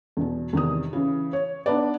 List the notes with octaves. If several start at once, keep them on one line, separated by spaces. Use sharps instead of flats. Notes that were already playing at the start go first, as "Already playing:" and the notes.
E2 B2
E2 C3 D#3 D#6
C#3 E3
C#5
B3 D4 D#4 B4 D5